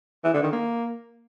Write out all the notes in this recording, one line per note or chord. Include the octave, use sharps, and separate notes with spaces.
E3
D3
D#3
A#3